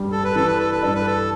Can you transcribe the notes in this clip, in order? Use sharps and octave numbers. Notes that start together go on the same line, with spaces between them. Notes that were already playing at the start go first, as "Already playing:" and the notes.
Already playing: G2 G3
A4
B4
E3 A4
B4
A4
B4
G2 A4
B4
A4